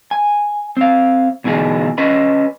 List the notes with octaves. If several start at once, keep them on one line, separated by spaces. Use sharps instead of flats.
G#5
C4 F5
D2 B2 E3 D#4 G#4
C#4 B4 D#5 B5